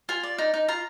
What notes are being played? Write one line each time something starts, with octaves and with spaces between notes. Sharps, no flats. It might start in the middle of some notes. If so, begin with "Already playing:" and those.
F4 G#5
D5
D#4
D#4
F4 A#5